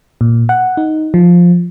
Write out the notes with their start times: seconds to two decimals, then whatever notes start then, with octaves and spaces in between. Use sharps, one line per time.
0.21 A#2
0.49 F#5
0.77 D#4
1.14 F3